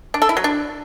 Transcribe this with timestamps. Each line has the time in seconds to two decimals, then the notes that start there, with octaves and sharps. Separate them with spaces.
0.14 D4
0.22 A4
0.29 E4
0.37 F#3
0.44 D4